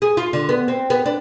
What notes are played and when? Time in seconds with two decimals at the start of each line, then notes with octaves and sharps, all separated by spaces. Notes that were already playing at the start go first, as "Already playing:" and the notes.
0.02 G#4
0.17 F4
0.33 D3
0.49 B3
0.68 C4
0.90 B3
1.06 D4